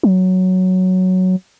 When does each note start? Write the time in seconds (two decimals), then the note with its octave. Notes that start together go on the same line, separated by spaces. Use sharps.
0.03 F#3